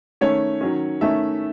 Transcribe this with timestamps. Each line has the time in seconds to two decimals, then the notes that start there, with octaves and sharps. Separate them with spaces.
0.21 D#3 A3 C#4 C#5
0.61 D#3 F#3 C#4
1.01 D#3 A3 C#4 E5